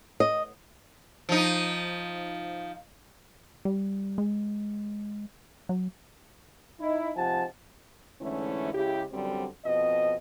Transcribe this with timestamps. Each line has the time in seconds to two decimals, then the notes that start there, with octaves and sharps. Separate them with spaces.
0.20 D#5
1.29 F3 D#4
3.65 G3
4.18 G#3
5.69 F#3
6.80 D#4 E4
7.17 G#2 C3 F3 F#5 G#5 A5
8.21 G#2 D3 E3 A3 C#4 E4
8.74 C#3 G#3 E4 G4
9.12 F#2 D3 G3 C4
9.65 F2 B2 C4 D#5